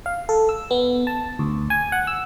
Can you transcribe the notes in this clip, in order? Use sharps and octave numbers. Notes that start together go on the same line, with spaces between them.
F5
A4
E6
B3
A5
D2
G#5
F#5
E6